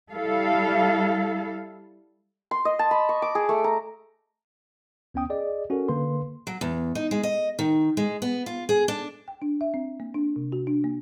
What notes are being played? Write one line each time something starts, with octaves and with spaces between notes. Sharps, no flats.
G3 E4 A4 F5
C6
D#5
A5
B5
C#6
D6
G#4
A3
A#5
D2 B3 C#4 G5 D#6
G#4 D5 D#5
C#4 F#4 A4 A#4
D3 A#3 B4 C6
F#3
E2
D#4
G#3
D#5
D#3
G#3
B3
F4
G#4
D4
G5
D4
E5
C4
A#3
D4
C3
F#4
D4
A#3